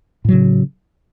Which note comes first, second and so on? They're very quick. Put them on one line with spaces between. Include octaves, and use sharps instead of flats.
A2 F#3 C#3